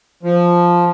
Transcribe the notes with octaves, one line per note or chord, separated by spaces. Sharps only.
F3